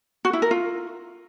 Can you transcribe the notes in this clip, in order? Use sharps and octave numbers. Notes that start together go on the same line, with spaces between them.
F#4
E4
A#4
F4